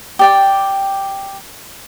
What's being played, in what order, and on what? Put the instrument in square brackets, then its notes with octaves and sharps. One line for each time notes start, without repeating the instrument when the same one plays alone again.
[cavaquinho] G4 D5 G5